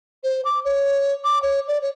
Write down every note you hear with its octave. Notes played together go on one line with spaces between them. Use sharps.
C5
D6
C#5
D6
C#5
D5
C#5